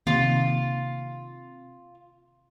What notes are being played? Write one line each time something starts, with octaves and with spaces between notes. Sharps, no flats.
C3 D#3 A#3 F4